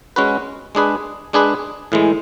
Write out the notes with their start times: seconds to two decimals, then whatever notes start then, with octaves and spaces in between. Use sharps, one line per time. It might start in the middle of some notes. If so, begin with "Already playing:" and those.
0.16 G#3 C#4 F#4 B4
0.75 G#3 D4 G#4 B4
1.33 G#3 D4 G#4 B4
1.92 A2 E3 G#3